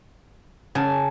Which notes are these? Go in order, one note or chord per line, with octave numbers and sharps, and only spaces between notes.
C#3 G#5 A5